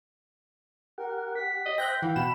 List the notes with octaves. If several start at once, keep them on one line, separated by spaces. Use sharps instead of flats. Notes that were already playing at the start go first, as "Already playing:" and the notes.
G4 A#4 F#5
B6
D#5
C5 E5 G5 F#6 G6 A#6
E3 F5 F#5
B2 B5 E7